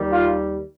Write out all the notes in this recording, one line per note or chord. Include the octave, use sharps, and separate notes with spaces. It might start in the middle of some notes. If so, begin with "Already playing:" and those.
Already playing: D#2 D#3 G3
F4